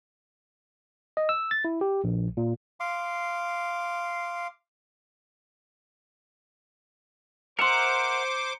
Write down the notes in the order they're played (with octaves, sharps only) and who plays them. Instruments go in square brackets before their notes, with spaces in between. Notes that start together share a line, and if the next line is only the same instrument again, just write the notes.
[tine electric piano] D#5
E6
A6
E4
G4
A#1
A#2
[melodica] F5 C6 D6
[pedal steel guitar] A#4 E5 F#5 [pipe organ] C5 D6 [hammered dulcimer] A#5 C6 [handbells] C#7